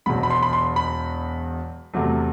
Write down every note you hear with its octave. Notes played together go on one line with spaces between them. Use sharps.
E1 E2 B2 F#3 B5
B5
C6
B5
C6
B5
E2 C3 F#3 A3